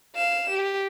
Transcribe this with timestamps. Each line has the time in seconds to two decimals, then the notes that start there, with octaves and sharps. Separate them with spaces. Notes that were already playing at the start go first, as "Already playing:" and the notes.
0.16 F5 E7
0.50 G4